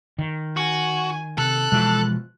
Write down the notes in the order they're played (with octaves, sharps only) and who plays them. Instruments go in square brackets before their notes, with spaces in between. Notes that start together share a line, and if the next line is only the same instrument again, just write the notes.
[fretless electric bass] D#3
[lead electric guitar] F#4 [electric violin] G#5
[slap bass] C3 [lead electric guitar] A4 [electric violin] F#6
[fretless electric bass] B2 E3 F3 [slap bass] G#3